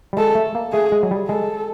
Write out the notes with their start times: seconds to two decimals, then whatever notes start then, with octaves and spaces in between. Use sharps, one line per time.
0.13 G3
0.17 G#3 A4
0.35 A3
0.55 A#3
0.73 A3 G#4
0.92 G#3
1.03 F#3
1.11 G3
1.29 G#3 A4